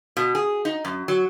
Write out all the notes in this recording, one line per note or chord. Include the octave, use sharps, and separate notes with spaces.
B2
G#4
D#4
F#2
F#3